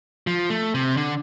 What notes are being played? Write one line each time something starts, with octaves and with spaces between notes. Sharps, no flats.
F3
A3
C3
D3